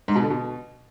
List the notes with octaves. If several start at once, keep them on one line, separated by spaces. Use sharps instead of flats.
G#2
B2
D3
B2